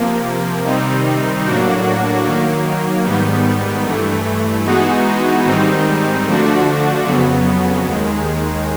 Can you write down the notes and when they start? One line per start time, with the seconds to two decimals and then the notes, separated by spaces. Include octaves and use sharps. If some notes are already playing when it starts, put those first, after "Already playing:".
Already playing: C3 F3 A#3
0.64 C3 D#3 G3 C4 D#4
1.44 A2 F#3 A#3 D4 F#4
2.25 D#3 F#3 A#3
3.05 G#2 D#3 G3 B3
3.85 G2 E3 A3
4.65 E3 G#3 B3 D#4 F#4
5.45 G#2 D#3 G3 C4 D#4
6.25 D3 F3 A3 D4 F#4
7.05 F2 C#3 F#3 B3
7.86 D#2 D#3 G#3